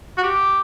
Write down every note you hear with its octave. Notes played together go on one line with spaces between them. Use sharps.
F#4
G4